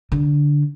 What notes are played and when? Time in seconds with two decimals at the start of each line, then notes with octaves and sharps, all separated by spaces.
0.12 D3